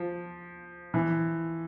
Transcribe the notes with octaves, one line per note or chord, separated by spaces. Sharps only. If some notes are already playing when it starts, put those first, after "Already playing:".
Already playing: F3
E3